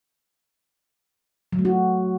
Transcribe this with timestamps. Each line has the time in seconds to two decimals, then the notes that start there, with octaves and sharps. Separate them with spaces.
1.53 F#3
1.59 A3
1.65 F#4